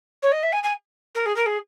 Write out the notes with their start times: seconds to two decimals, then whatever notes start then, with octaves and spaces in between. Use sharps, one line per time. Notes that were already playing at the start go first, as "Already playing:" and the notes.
0.22 C#5
0.32 D#5
0.43 E5
0.53 G#5
0.63 G#5
1.15 A#4
1.26 G#4
1.36 A#4
1.46 G#4